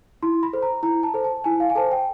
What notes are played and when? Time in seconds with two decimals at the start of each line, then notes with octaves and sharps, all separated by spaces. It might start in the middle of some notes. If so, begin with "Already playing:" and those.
0.23 E4 C6
0.43 B5
0.53 A4 C5
0.62 A#5
0.83 E4 A#5
1.03 A5
1.14 A4 C5
1.24 A5
1.44 E4 G#5
1.60 F5
1.70 G#5
1.75 A4 C5 A5
1.92 G5